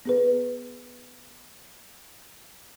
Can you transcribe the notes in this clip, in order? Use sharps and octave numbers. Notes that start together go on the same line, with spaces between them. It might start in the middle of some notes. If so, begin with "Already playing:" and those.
B3 G#4 B4